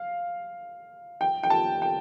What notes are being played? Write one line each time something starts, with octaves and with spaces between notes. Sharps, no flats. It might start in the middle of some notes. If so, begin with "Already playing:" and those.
Already playing: F5
G5
G5
A5
G5